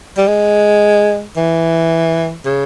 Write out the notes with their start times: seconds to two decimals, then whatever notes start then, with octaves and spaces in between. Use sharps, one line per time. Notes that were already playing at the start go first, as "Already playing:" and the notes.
0.17 G3
0.27 G#3
1.36 E3
2.45 C#3